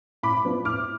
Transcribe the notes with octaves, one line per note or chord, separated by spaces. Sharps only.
A2 B5 D6
F3 B3 D4
A2 D6 F6